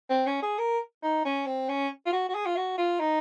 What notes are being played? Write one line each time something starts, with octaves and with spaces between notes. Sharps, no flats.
C4
C#4
G#4
A#4
D#4
C#4
C4
C#4
F4
F#4
F#4
G#4
F4
F#4
F4
D#4